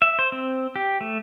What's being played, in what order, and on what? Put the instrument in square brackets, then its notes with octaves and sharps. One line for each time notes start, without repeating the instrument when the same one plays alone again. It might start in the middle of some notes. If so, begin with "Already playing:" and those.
[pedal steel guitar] E5
C5
C4
G4
A3